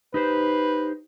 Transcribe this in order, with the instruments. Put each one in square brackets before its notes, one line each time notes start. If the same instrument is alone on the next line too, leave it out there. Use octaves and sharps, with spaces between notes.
[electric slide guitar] D#4 G4 C5 [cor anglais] B4